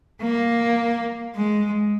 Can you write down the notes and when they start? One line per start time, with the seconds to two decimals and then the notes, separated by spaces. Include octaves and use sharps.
0.22 A#3
1.36 G#3